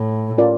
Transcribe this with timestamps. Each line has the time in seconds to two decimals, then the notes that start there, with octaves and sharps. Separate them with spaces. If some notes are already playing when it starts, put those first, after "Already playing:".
Already playing: A2
0.38 C#4 F4 A#4 D5